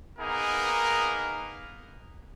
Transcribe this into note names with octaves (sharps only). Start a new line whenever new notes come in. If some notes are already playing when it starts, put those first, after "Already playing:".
A#3 B3 D#4 G#4 A#4